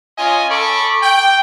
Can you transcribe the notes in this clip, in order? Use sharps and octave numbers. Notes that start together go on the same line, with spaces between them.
C#4 F4 D#5 G#5
A4 B5 C#6 D6
G5